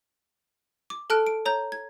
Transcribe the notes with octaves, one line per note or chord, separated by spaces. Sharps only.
D6
A4 A5 F6 F#6 D7
D7
C#5 A#5 G6
G#6